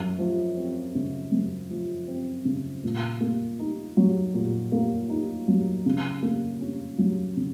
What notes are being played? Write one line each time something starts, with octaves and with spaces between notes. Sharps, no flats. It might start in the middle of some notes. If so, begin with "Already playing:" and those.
Already playing: F#2
F3
C4
C#3
F#2
F3
C4
C#3
A#2
A#3
D#4
F#3
A#2
A#3
D#4
F#3
C#3
A#3
C#4
F#3
C#3